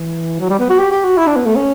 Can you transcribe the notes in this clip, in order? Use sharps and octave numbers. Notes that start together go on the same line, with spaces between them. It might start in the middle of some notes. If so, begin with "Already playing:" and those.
Already playing: E3
F#3
G3
B3
F#4
G4
G4
F#4
E4
D4
B3
A3
C#4